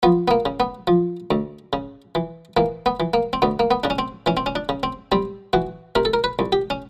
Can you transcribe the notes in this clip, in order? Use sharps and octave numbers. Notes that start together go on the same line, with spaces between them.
F3 B3
B3
A#3
C#3
B3
F3
D2
C#3
E3
E3 A#3
B3
E3
A#3
C4
D2 B3
A#3
B3
C#3 D4
C#4
C4
E3 C#4
C4
C#4
D4
C#3
C4
G3 C4
E3 F#4
C3 A#4
A4
A#4
B4
C2
G4
C#4